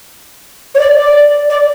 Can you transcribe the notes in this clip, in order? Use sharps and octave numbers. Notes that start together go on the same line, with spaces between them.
C#5
D5
D5
D5